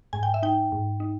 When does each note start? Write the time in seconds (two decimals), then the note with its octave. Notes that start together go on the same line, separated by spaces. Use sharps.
0.13 G#2 G#5
0.23 G5
0.34 E5
0.43 D#4 G5
0.72 G#2
1.00 D#4